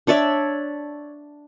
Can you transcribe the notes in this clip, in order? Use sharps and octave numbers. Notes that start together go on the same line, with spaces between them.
D4 C#5 D5 E5